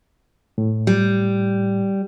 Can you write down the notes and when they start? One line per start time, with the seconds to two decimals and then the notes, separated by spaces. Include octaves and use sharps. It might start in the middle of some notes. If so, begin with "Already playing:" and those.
0.58 A2
0.87 G3